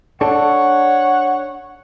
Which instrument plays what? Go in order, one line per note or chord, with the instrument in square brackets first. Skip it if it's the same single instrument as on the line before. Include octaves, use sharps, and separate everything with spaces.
[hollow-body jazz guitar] D4 A4 [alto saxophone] C#5 [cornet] F#5